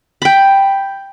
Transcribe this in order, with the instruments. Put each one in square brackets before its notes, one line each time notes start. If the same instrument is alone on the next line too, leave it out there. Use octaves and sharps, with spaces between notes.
[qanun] G5 B5